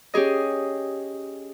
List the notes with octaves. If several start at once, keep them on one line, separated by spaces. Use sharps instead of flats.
C#4 G4 G#4 D#5